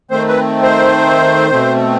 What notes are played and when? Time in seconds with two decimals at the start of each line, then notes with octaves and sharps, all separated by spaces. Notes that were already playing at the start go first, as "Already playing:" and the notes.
0.11 D#3 A3 C4 C5
0.28 B4
0.63 C5
1.51 B2 A3 C4